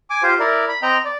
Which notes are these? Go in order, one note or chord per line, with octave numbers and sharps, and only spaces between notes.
G#5 D6
F4 G4 C5
E4 A#4 D5
B5
C4 D#5 G5 A#5
D5